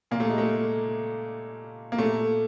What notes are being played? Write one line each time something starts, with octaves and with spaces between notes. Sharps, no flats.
A#2 A#3
A3
G#3
A3
A#3
A#2 A3